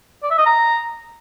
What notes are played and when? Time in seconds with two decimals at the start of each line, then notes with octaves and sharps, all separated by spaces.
0.23 D5
0.31 E5
0.38 D#5
0.46 A#5